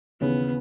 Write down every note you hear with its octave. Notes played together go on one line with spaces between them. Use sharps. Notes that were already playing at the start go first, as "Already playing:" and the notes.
D#2 C#3 E3 B3